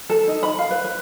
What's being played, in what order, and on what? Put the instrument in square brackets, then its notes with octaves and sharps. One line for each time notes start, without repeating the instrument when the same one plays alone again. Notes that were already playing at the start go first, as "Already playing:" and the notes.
[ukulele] A4
D#4
B5
F5
B4
B4